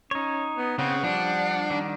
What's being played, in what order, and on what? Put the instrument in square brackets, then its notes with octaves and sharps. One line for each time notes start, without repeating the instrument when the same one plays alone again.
[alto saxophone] C#4 [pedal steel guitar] D#4 C#5
[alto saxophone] B3
[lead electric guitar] C#3 [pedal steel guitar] B3 C4 [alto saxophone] F#5
[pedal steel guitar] F3 G3 [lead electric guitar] D4
[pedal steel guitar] D#3 G3